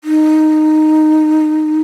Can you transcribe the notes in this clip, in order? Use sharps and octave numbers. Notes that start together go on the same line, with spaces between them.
D#4